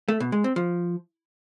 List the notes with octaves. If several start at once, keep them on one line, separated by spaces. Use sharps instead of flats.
A3
B2
G#3
C4
F3